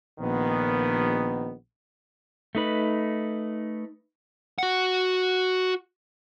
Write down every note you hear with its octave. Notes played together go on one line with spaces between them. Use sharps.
A#1 D#3 B3
A3 D#4 B4
F#4 F#5